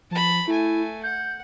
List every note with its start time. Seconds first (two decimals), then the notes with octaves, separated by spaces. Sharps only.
0.11 F3 A5 B5
0.47 A3 E4 G#5
1.03 F#5 G6